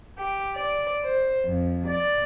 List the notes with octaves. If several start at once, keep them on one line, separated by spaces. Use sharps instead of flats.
G4
D5
C5
F2
D5